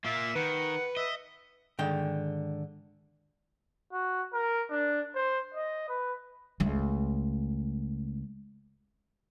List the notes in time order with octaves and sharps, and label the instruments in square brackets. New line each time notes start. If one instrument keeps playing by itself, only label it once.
[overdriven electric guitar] A#3 F4 [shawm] E5
[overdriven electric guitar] D#3 [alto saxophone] B4 [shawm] F#5
[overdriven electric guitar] D#5 [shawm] E5
[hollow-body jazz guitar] G#2 D3 D#3 G5
[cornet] F#4
A#4
D4
C5
D#5
B4
[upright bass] C#2 A3